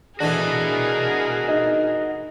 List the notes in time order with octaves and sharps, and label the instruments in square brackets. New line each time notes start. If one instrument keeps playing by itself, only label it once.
[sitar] E3 A3 D4 [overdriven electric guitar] F#4 D#5 [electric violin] G#4 A#4
[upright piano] D#4